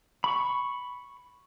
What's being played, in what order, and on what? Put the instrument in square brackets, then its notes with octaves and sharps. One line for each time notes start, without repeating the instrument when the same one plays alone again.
[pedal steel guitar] B5 C#6